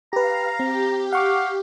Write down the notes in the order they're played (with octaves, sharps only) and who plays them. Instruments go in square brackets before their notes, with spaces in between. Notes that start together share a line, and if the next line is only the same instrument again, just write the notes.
[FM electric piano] G4 B4 [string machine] F5 [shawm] A#5
[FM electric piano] C4 [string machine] G4
[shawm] F5 [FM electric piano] F#5 C#6 D6